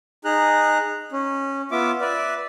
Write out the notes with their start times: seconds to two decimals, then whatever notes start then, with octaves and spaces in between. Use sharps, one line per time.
0.25 D#4 G#4 A#5 F#6
1.12 C#4
1.72 B3 F4 E5 D6
2.01 B4 D5 E5